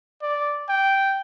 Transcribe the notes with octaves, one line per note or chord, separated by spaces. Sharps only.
D5
G5